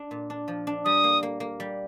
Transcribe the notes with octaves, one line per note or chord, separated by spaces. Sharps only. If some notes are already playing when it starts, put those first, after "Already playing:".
Already playing: D4
A#2
D4
F3
D4
G3 D#6
A#3
A#3
A#3
G3